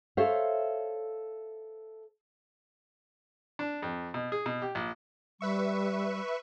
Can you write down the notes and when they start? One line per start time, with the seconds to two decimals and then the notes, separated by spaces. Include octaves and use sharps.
0.17 A4 C5 C#5 E5 F5
3.59 D4
3.82 F2
4.14 B2
4.32 G#4
4.46 B2
4.62 G4
4.75 A#1
5.41 G3 B4 E5 C#6